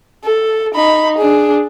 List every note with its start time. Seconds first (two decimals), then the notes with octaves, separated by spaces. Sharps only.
0.24 A4
0.75 D#4 B5
1.18 D4 G#4